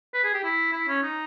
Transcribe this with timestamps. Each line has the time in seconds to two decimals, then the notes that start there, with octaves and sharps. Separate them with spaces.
0.14 B4
0.24 G#4
0.34 G4
0.44 E4
0.72 E4
0.88 C#4
1.03 D#4